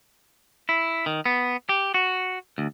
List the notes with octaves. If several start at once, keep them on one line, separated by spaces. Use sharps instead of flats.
E4
D#3
B3
G4
F#4
D2